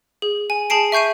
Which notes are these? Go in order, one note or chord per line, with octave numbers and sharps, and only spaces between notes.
G#4
G#5
G#4 G#5 A5 C7 D7
E5 C#6 G6 C7 D#7